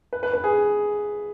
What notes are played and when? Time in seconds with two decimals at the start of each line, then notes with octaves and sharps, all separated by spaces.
0.13 B4
0.23 B4
0.33 B4
0.44 G#4